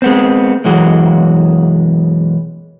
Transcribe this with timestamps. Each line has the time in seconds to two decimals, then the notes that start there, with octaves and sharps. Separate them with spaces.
0.02 G#3 B3 C4
0.65 B1 F#2 E3 G#3 F#4